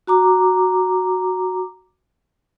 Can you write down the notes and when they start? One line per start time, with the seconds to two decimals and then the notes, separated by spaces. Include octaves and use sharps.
0.07 F#4 A#5 D6